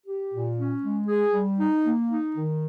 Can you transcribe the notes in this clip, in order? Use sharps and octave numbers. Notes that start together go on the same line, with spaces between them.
G4
A#2
C#4
G#3
G#4
G3
D#4
A#3
D#4
D#3